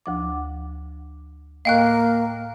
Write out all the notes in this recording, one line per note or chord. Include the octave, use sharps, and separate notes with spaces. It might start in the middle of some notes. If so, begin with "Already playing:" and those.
D2 F3 D6
A2 A#3 D#5 F5 G5 F#6